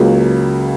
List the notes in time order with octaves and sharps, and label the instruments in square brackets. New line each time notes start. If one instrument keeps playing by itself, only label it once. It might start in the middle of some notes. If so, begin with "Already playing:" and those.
Already playing: [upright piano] C#2 C#3 F#3 A#3